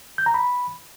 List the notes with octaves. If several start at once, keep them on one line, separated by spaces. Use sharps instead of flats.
G6
A#5
B5